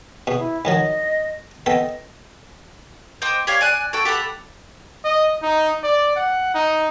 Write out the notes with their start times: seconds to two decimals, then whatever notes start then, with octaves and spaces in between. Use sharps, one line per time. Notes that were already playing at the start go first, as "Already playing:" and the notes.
0.27 B2 G#4
0.39 E4
0.65 G#2 D#3 F#3 D#5
1.66 B3 A4 D#5 G5
3.22 C5 D#5 G5 D6
3.47 G4 C#5 D5 F5
3.61 D5 G#5 F#6
3.93 F#4 A4 G5
4.05 G4 A4 F#5 B5
5.05 D#5
5.42 D#4
5.83 D5
6.16 F#5
6.54 D#4